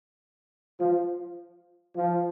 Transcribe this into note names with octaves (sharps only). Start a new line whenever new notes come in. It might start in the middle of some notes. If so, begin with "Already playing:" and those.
F3
F3